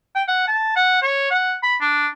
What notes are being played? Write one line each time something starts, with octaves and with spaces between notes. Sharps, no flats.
G5
F#5
A5
F#5
C#5
F#5
B5
D4